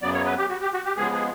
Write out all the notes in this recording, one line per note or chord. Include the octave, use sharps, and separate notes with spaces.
F#2 C#3 F#3 B3 D5
C#5
B4
G4
F#4
G4
F#4
G4
C#3 F3 G#3 B3 G#4
G#4